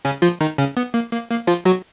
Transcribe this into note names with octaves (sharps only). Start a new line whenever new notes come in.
C#3 C#4
F3 F4
D#3 D#4
C#3 C#4
B3
A#3
A#3
A#3
F3 F4
F#3 F#4